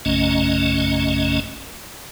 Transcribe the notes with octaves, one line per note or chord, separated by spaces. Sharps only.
A#1 F#2 C#3 A3 C#4 D#5